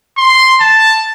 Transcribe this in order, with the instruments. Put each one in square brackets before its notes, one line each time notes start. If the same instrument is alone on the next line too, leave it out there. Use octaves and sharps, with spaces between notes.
[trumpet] C6
A5